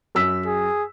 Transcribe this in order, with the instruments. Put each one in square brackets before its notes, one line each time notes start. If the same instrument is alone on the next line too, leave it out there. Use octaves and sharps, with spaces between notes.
[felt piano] F#2 E6 B6
[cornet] G#4